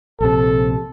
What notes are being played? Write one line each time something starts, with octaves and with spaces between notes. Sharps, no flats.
A#1 C3 A4